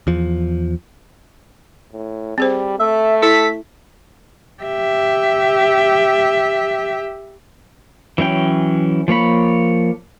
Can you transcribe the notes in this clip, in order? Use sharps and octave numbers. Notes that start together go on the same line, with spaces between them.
E2 F3
A2
G3 C4 G#4 C5
A3 E5
E4 A4 B6
G4 E5
E3 F#3 C#4 G5
F3 A#3 C#5 B5